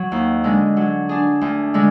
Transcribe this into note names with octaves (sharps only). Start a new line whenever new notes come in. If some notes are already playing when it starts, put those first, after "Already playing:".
Already playing: F#3
D#2
D3 G#3
F#3
D4 G#4
D2
D3 G#3